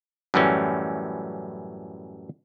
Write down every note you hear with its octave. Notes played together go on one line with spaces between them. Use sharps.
F#2 A2 E3 G3 C#4